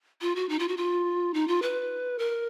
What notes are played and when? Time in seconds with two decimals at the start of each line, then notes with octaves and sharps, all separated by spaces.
0.21 F4
0.36 F#4
0.49 D#4
0.59 F4
0.68 F#4
0.77 F4
1.34 D#4
1.48 F4
1.62 B4
2.19 A#4